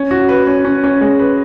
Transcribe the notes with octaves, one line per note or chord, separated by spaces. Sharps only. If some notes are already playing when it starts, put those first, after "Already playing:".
Already playing: C#4
F#4
B4
C#4
C#4
C#4
G#3
B4